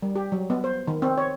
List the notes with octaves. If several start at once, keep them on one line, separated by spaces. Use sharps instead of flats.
G3
G4
F#3
B3
C5
D#3
C4
C#5